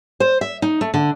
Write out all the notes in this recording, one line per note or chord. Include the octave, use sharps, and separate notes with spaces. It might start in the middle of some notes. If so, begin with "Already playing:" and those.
C5
E5
D#4
A3
D3